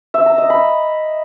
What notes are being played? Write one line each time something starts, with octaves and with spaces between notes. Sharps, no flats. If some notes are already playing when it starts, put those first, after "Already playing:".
E5
A#5
D#5
B5